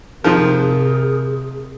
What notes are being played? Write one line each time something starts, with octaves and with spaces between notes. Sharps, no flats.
F2 C3 D#3 F3 G#4 A#4